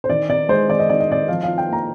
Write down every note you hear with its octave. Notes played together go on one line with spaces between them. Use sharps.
C5
D#3 D5
D#4 D5
G#3 C5
D#3 D5
D#5
D#3 D5
D#5
D#4 D5
F3 F5
F4 F5
G5
A#3 A#5